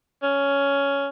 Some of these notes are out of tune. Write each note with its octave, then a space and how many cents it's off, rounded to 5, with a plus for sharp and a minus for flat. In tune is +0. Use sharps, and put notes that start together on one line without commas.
C#4 +10